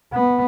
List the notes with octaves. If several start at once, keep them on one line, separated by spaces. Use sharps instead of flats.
B3